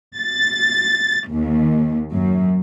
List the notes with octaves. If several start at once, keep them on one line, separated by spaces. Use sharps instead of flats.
A6
D#2
F#2